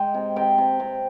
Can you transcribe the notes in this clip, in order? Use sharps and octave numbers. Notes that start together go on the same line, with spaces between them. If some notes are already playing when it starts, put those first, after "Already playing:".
Already playing: G#3 G5
C3
C3 G5
C3
C3